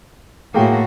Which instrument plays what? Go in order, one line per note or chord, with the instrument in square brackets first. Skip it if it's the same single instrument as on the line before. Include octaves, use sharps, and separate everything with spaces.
[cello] A2 F#4 [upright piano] A#3 G#4 G5